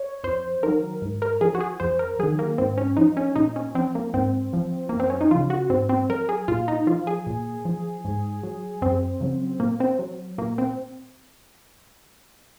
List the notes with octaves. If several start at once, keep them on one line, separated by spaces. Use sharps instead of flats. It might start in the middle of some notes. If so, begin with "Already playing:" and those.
Already playing: C#5
F2 C5
D#3 F#3 A#4
G#2
A#4
F3 G#4
F#4
G#4
F2 C5
A#4
D#3 F#3 G#4
A#3
G#2 C4
C#4
F3 D#4
C#4
A#2 D#4
C#4
F3 C4
A#3
G#2 C4
F3
F#2 A#3
C4
C#4
D#4
C#3 F3 F4
F#4
G#2 C4
C4
F#3 A#4
G#4
A#2 F4
D#4
F3 F4
G#4
A#2
F3
G#2
F#3
F#2 C4
C#3 F#3
A#2 A#3
C4
F#3
A#2 A#3
C4